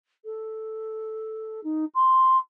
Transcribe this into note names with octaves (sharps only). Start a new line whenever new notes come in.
A4
D#4
C6